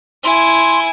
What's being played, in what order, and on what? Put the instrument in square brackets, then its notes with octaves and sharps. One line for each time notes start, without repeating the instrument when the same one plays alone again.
[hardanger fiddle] E4 G#5 [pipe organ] C6